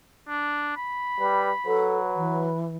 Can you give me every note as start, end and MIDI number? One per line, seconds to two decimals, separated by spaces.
0.28 0.74 62
0.77 1.98 83
1.21 1.50 55
1.21 1.52 71
1.66 2.50 54
1.66 2.00 69
1.66 2.63 71
2.16 2.77 52